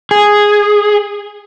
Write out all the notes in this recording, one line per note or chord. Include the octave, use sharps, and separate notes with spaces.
G#4